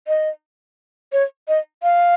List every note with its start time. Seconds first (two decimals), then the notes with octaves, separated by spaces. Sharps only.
0.08 D#5
1.13 C#5
1.48 D#5
1.83 F5